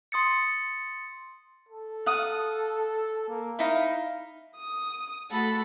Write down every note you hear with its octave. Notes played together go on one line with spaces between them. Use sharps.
C6 D#6 A6 C#7
A4
F5 F#5 D#6
A#3
D#4 E4 F5
D#6
A3 F#4 A4 B5